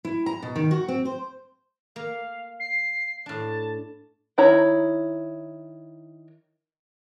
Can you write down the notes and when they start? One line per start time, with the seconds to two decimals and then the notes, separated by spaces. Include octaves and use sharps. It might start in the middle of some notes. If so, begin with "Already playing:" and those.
0.05 E4
0.26 A#5
0.42 B2
0.56 D#3
0.71 F#4
0.88 C4
1.05 C5
1.96 A#3 F5
2.60 C7
3.26 A2 D4 A5
4.38 D#3 E4 C#5 A#5